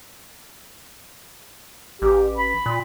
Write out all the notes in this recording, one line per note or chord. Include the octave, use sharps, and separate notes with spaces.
A1 G4
B5
A#2